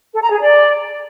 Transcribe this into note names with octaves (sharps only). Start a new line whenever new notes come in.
A4
A#5
G#4
D5